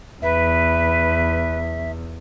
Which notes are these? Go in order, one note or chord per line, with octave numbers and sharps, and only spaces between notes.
E2 B4 E5